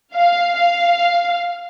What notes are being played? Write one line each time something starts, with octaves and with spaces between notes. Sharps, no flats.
F5
F5